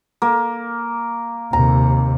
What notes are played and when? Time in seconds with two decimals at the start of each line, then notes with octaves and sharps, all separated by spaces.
0.22 A#3
1.53 D#2 C3 A#5